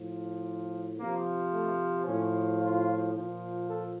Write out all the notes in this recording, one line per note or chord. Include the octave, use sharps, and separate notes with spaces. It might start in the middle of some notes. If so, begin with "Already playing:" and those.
Already playing: A2 F3
C3 F3 A#3
A3
A2 F3 C#4
F4
A#2 F3
A4